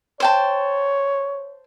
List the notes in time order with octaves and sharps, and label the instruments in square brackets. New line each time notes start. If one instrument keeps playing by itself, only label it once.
[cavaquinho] C5 G5 A5 [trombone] C#5